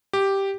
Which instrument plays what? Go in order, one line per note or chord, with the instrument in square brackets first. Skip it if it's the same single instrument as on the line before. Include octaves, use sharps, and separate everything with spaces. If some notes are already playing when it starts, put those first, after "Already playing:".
[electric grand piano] G4